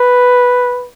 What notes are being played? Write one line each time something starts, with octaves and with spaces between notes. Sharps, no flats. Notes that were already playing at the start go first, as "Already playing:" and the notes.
Already playing: B4